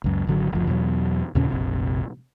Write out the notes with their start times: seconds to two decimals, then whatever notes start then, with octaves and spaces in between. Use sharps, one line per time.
0.04 C#2 F#2
0.27 G#1 D3 F#3
0.52 F#1 D2 F3
0.67 E2 B2 F#3
1.35 D#2 A#2 C#3 C#4
1.50 F1 A#1 C3